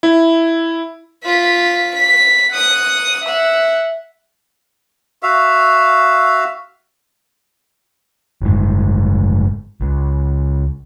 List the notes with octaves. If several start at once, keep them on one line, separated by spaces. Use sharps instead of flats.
E4
F4 B6
B6
F#5 D#6
E5 F#5
F#4 E5 F5
F#1 G#2
C#2